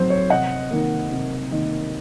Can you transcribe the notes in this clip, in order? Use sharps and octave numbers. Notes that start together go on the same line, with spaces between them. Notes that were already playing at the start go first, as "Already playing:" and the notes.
Already playing: A2 F#3 C4 C5
C#5
C3 D#5 F#5
D#3 A#3
C3
D#3 A#3